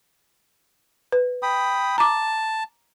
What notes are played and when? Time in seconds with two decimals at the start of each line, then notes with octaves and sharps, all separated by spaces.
1.12 B4
1.43 G5 B5 D#6
1.98 A5 A#5 D6